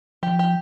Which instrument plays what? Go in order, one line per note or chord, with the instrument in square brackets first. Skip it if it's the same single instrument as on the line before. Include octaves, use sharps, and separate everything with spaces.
[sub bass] F3 [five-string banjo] G4
[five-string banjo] G4